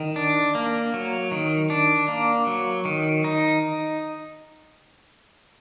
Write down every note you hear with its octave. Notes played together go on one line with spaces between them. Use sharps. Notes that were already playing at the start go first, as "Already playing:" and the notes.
Already playing: D#3
D4
A#3
F#3
D#3
D4
A#3
F#3
D#3
D#4